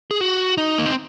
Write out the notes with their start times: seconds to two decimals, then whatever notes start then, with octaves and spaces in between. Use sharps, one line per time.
0.11 G#4
0.21 F#4
0.58 D#4
0.78 A#3
0.86 C4